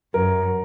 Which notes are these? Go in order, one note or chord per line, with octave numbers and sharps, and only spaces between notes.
F#2 A#4